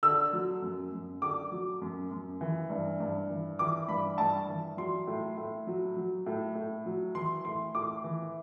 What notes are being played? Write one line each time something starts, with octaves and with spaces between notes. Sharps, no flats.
D3 E6
F#3
F#2
F#2
D3 D6
F#3
F#2
F#2
E3
G2
G2
E3
E3 D6
G2 B5
G2 A5
E3
F#3 C6
A2
A2
F#3
F#3
A2
A2
F#3
E3 C6
A2 C6
A2 D6
E3